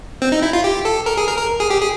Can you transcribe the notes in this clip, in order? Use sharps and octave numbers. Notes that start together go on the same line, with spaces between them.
C4
D#4
E4
F4
G4
A4
A#4
G#4
A#4
A#4
G#4
G4
G#4